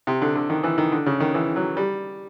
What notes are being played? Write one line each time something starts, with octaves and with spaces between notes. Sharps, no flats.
C3
D3
D3
D#3
E3
D#3
D3
C#3
D#3
E3
F#3
G3